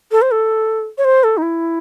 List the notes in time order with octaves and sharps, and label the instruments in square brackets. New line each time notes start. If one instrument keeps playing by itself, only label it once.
[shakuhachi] A4
C5
A4
C#5
C5
A4
D#4
E4